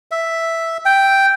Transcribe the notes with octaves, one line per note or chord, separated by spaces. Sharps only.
E5
G5